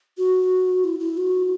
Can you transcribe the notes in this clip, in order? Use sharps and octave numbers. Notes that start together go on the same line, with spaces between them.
F#4
E4
E4
F#4